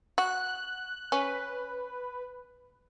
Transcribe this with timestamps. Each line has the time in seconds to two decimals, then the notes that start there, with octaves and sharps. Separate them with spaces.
0.18 F#4 F#6
1.12 C#4 B4